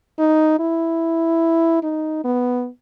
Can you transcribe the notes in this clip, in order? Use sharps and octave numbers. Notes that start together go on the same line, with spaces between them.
D#4
E4
D#4
B3